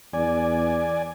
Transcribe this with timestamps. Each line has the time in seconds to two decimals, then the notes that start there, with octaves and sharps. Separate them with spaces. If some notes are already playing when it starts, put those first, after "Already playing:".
0.13 E2 D5 G#5